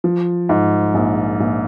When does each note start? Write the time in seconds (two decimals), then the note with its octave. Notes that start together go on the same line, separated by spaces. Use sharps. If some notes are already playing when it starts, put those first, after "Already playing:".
0.04 F3
0.49 G#2
0.94 A#1
1.40 A#1